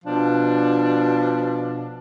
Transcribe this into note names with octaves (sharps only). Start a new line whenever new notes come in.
B2 F3 D4